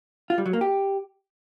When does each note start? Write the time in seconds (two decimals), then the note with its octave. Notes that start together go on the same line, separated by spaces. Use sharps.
0.30 F4
0.38 G3
0.46 F#3
0.53 A#3
0.61 G4